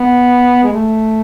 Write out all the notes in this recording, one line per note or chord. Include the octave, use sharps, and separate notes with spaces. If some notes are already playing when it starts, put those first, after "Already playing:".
Already playing: B3
G#3
A3